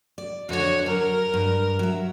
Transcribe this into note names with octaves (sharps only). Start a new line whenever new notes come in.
D5
F2 D3 F#4 C#5
F#3 A#4
G2
F#3 E5